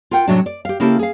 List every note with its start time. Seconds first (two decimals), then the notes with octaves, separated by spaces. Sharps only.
0.11 F4 A#4 F#5 G5
0.27 A2 C3 F#3 G3 D4
0.46 D5
0.65 G4 F5
0.80 C#3 A#3 E4 G4 A4
0.99 G#4 F5